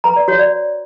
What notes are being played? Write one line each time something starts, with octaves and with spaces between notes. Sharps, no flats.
B4 A#5
D5
F#4 C#5
D5